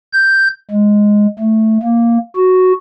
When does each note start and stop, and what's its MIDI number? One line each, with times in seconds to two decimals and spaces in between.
0.13 0.48 91
0.71 1.27 56
1.40 1.78 57
1.82 2.17 58
2.37 2.73 66